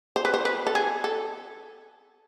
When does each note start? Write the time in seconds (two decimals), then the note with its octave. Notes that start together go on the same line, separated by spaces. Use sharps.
0.16 C5
0.25 B4
0.34 C5
0.45 B4
0.67 A4
0.75 G#4
1.04 A4